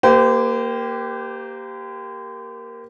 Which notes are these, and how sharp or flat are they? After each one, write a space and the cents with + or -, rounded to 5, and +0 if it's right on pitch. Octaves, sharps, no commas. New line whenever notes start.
A#3 +0 G4 +0 C5 -40